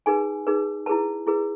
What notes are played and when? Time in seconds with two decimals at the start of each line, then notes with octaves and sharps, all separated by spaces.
0.06 D#4 G#4 B4 G#5
0.47 D#4 G#4 B4
0.86 E4 G#4 B4 A5
1.27 E4 G#4 B4